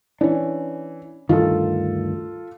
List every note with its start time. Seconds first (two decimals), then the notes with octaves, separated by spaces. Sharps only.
0.21 E3 C#4 D4
1.29 D2 G2 D#3 F4 A4